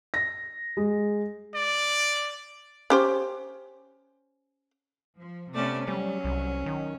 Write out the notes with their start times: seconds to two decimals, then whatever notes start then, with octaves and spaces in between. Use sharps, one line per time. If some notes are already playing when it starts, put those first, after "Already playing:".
0.14 A#6
0.77 G#3
1.54 D5
2.90 C#4 G4 C5
5.17 F3
5.54 C3 A3 B3 C#4 D5
5.88 F#3 G3 C#4
6.24 C2
6.66 D#3